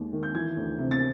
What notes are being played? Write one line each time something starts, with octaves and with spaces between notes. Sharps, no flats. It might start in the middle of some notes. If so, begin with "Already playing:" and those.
Already playing: D#2 G#3
D#3
G6
E3 G#6
D2
C3
A6